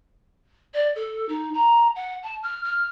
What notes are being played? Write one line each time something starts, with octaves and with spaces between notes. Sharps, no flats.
D5
A4
D#4
A#5
F#5
A5
F6
F6